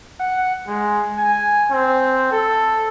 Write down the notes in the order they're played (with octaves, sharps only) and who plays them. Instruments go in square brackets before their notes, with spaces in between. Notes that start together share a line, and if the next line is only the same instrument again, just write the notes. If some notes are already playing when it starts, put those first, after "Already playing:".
[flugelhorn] F#5
G#3
G#5
C4
A4